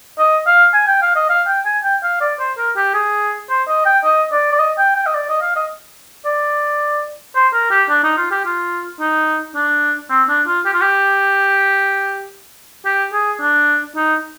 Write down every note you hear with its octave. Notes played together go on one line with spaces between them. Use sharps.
D#5
F5
G#5
G5
F5
D#5
F5
G5
G#5
G5
F5
D5
C5
A#4
G4
G#4
C5
D#5
G5
D#5
D5
D5
D#5
G5
G5
D#5
D5
D#5
F5
D#5
D5
C5
A#4
G4
D4
D#4
F4
G4
F4
D#4
D4
C4
D4
F4
G4
F4
G4
G4
G#4
D4
D#4